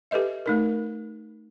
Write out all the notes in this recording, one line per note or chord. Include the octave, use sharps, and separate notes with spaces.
G4 A4 B4 D#5 E5
A3 D#4 A#4